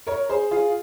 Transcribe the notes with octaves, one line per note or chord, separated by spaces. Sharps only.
A#4 C#5
G#4 C5
F4 G#4